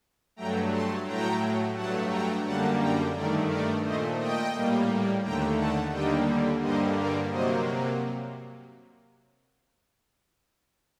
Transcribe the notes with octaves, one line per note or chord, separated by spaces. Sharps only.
G2 F#3 A3 G5 A#5
A5 C6
A2 F#3 A3 G5 A#5
G2 F#3 A3 F#5 A5
G5 A#5
F#2 D3 G3 A#3 F#5 A5
G5 A#5
G2 D#3 A3 A#4 D5
A#4 D5
A#2 A3 C5 D#5
D#5 G5
A2 G3 A#3
D#2 D3 A3 G5 A#5
F#5 A5
D#2 D3 G3 A#3 D#5 G5
G2 D3 G3 A#3 C5 D#5
A#4 D5
C3 F#3 A#3 C5 D#5